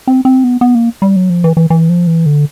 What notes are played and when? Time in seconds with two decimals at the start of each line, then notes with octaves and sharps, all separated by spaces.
0.07 C4
0.25 C4
0.44 B3
0.61 B3
0.75 A#3
1.02 G3
1.16 F#3
1.30 F3
1.44 E3
1.57 E3
1.70 E3
1.89 F3
2.07 E3
2.26 D3